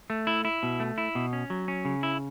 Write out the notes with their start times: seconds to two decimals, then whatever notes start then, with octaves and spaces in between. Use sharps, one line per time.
0.10 A3
0.27 E4
0.45 E4
0.63 B2
0.80 A3
0.98 E4
1.15 B2
1.33 C#4
1.50 F#3
1.68 C#4
1.85 C#3
2.03 E4